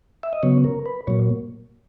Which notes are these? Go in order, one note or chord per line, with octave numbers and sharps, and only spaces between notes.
E5
D#5
C#3 F#3 B3 C#5
A#4
B4
A#2 F#3 A#3 C#5